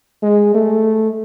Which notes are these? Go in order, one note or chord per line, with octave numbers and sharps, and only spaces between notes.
G#3
A3